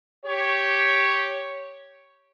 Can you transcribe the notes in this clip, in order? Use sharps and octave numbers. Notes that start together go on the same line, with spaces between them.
G4 C#5